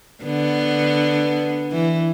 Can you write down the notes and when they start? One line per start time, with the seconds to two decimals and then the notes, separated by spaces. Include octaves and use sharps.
0.23 D3 B3
1.71 E3